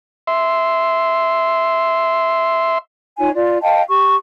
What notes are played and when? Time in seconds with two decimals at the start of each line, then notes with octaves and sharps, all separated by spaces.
0.27 E5 C6
3.19 D#4 F4 C#5 G#5
3.35 F4 D5
3.62 D#5 F5 G5 A5
3.88 G4 C#6